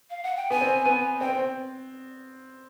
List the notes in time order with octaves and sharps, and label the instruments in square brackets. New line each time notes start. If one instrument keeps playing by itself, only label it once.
[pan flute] F5
F#5
G5
[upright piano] B3 [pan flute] G#5
[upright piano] C4
B3
[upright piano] C4 [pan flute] G5
[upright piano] C4